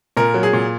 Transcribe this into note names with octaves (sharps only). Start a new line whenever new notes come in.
A#2 A#4
F#3
G#4
A#2